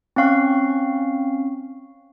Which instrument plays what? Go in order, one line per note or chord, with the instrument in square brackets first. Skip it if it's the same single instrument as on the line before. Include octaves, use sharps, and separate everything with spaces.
[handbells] C4 C#4 F5 C#6